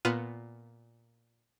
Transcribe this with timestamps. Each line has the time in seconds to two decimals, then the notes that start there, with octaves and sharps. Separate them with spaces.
0.05 A#2 B3 F4 B4 F6 D#7